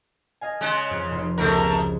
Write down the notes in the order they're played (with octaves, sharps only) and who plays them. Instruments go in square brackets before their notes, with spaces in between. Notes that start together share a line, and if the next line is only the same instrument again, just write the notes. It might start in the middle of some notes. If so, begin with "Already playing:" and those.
[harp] D#5 F5 G#5
[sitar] C#3 G#3
[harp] F2
F1 F4
[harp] C#2 [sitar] B2 A3 A#4